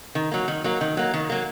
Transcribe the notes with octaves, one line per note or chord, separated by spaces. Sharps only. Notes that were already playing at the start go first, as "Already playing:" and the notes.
D#3
F#3 A#3
D#3
F#3 A#3
D#3
F#3 A#3
D#3
F#3 A#3